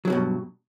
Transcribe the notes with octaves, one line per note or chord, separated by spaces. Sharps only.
G2 B2 D3 F#3